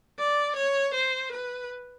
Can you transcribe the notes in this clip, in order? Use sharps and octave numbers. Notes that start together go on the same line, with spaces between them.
D5
C#5
C5
B4